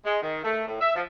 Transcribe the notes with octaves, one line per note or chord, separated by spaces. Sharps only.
G#3
D#3
A3
A2
E5
F3